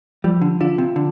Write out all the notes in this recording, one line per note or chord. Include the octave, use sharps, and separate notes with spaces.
F3 G3
D3
D3 F4
C3
D3